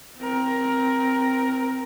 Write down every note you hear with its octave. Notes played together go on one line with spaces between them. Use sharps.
C4 A#4